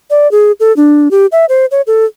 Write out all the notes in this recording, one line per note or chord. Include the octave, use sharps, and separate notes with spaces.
D5
G#4
A4
D4
G4
E5
C5
C#5
A4